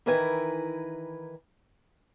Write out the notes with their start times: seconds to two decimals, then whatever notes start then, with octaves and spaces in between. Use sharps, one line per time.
0.06 D#3 E3 E4 A#4 B4 G#5